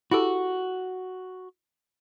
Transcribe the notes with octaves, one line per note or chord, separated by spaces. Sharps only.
E4 F#4 G4 A4